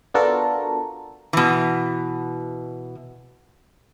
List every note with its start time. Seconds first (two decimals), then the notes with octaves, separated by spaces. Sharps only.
0.14 B3 D4 F4 F#4 A4 A#4
1.33 B2 E3